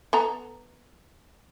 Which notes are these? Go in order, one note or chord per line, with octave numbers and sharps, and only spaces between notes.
B3 A4 A#5